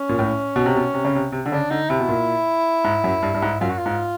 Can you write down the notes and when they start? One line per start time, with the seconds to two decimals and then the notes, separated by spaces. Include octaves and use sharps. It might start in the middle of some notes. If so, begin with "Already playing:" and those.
Already playing: C#4
0.09 A#2
0.19 A2
0.56 B2
0.66 C3
0.76 B2
0.94 C3
1.05 C#3
1.15 C3
1.32 C3
1.46 D3
1.52 C#3 D4
1.70 D3 D#4
1.89 C3 E4
2.00 B2
2.09 A#2
2.84 G#2
3.04 F#2
3.22 G2
3.34 G2
3.42 G#2
3.61 F#2 F4
3.70 F#4
3.78 F4
3.86 G#2